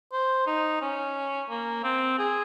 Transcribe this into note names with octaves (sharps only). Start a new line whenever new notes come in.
C5
D#4
C#4
A#3
C4
G#4